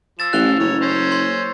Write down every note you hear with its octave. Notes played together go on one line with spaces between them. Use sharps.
F3 E6 A6 E7
A1 F#6 F7 G7
F#1 C#5
C#4 C5
C6 G6